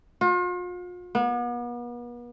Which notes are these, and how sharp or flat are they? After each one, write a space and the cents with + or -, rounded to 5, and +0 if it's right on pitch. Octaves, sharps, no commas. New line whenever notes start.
F4 +40
B3 -40